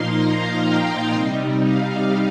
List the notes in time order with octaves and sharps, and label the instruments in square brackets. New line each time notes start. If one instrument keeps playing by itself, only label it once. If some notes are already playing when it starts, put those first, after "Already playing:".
Already playing: [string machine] A#2 F3 A#3 D#4 F5 C6
A#5
G5
C3 G3 D#4
F5